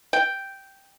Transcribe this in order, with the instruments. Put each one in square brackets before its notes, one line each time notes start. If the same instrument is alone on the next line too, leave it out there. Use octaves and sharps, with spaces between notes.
[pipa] G5